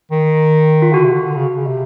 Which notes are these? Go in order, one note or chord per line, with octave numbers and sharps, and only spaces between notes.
D#3
F4
D3 F#4
C3
D3
D3
C#3
C#3
C3